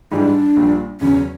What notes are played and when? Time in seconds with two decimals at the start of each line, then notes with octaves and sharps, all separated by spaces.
0.11 G#2 E3 G3 D4 D#4
0.56 A#1 A#2 G3
1.01 E2 C#3 F#3 C#4